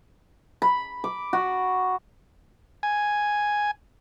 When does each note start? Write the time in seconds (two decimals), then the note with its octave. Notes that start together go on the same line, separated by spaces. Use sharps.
0.62 B5
1.04 D6
1.33 F#4
2.83 G#5